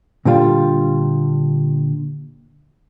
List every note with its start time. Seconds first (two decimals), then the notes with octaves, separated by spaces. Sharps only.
0.25 A#2 D3 G3 F4